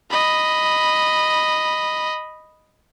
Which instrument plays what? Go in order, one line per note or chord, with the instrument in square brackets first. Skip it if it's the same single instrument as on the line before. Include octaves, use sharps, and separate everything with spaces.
[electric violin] D#5 B5